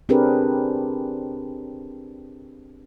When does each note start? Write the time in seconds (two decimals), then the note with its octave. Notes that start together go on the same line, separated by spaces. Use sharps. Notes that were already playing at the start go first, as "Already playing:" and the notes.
0.09 C4 D4 G4 G#4 A#4 B4